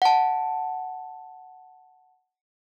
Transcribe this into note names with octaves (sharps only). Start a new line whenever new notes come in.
F#5 A5